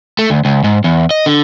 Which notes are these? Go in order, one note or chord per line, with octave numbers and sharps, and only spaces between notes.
A3
D2
C#2
G#2
E2
D#5
D3